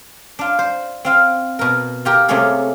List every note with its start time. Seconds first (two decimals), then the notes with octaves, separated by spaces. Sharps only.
0.39 D4 F4
0.59 C5
1.05 C4 F4 F5
1.59 B2 A#4
2.05 F4 G4 A#4
2.28 C3 A3 A#3 C#4 F4 G#4